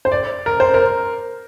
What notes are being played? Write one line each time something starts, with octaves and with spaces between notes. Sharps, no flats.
C5
D5
A#4
C5
A#4